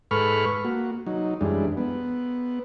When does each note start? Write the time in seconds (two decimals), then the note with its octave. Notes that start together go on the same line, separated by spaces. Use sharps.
0.11 G#2 A4 B4 B5 C#6 F6
0.64 A#3 F#4
1.06 F#3 D#4
1.41 F#2 E3 G3 G#3 D4
1.77 B3